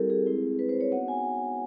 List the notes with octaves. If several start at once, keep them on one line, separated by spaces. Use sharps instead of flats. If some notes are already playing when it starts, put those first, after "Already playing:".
Already playing: G3 C4 E4 G4 A4 A#4
G#4
G#3 C4 E4
B4
C5
C#5
B3 D#4 F#4 F#5
G#5